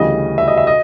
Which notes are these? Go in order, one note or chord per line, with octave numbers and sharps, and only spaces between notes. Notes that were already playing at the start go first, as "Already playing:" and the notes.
Already playing: D2 C#3 E3 G3 D#5
E5
D#5
E5
D#5